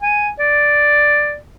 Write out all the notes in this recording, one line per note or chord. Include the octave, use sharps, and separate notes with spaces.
G#5
D5